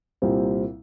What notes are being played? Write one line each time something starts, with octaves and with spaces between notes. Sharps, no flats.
C2 A#2 G3 C4